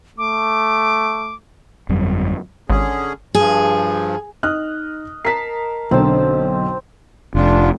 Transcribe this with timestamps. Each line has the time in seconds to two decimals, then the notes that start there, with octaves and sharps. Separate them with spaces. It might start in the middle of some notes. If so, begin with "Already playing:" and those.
0.18 A3 D6
1.89 G1 F2 F#3 G3
2.70 G#1 D3 C#4 G#4
3.35 G2 F3 G#4
4.43 D#4 D#5 F6 F#6
5.25 A#4 A5 B6 C7
5.91 B1 D3 C4 A5
7.35 F1 D4 F4